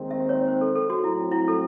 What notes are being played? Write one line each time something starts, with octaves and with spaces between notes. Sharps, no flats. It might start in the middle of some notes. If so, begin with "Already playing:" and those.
Already playing: D#2 D#3 G#3 C4
E5
C#5
C5
A4
A4
F#4
A2 F#3 A3 C4 E4
E4
A4